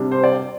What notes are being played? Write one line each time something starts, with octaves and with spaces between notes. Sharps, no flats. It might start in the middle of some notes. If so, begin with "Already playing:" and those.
Already playing: C3 G3 D4
C5
D5